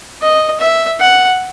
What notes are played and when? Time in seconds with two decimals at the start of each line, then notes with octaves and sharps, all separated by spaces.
0.22 D#5
0.61 E5
1.00 F#5